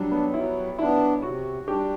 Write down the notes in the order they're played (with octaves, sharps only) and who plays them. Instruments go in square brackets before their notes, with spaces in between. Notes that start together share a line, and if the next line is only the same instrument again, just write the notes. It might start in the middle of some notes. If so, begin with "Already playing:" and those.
Already playing: [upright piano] F#3 G3 [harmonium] D4
[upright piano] B3
[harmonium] F#3 [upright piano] E4
[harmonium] B3 D4 [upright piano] E4
[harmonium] C3 [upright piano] F#4
[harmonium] G3 D4 [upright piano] G4